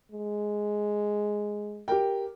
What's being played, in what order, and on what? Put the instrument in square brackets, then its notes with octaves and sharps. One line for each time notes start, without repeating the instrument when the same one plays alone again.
[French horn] G#3
[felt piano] G4 A#4 G5